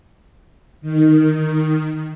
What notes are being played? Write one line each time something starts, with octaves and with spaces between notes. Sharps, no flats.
D#3